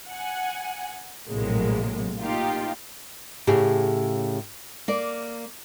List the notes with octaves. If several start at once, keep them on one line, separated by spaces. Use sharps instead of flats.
F#5 G#5
A#1 A2 C3 F#3 G#3 A#3
A#3 D#4 F4 G4
A2 C#3 G4 G#4
A#3 D5